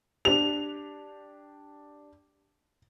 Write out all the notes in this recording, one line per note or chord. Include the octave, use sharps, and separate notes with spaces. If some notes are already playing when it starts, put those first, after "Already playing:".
D4 G4 F7